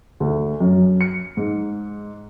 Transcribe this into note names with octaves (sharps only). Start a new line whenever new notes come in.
D2
F#2
C#7
G#2